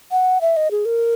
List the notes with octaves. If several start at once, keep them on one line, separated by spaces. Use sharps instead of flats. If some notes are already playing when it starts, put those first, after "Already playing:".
F#5
E5
D#5
G#4
A#4